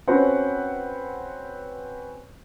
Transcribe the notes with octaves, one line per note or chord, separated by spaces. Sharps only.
C4 C#4 F#4 B4 C5 F#5